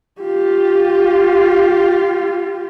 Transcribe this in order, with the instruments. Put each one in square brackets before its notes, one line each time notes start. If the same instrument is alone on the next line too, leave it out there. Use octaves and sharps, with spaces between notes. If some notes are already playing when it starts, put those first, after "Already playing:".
[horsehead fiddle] F4 G4